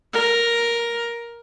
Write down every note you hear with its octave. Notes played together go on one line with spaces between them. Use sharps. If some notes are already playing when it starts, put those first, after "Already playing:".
A#4